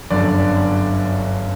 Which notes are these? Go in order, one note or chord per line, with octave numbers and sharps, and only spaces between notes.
G1 F#2 D3 D5